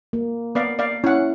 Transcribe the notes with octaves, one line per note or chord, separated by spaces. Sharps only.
A#3
B3 D5 F5
D5 F5
C#4 E4 F#5